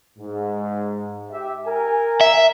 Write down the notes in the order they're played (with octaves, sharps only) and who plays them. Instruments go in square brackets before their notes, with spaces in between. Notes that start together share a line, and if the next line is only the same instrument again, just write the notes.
[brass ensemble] G#2
G4 E5
A#4 G#5
[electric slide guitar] E5